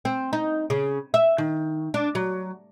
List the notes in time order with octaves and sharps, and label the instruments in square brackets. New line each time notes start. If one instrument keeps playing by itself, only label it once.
[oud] C4
D#4
C#3
E5
D#3
D4
F#3